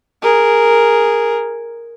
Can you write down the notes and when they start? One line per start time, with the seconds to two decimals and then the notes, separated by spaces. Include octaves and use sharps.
0.22 G#4 A#4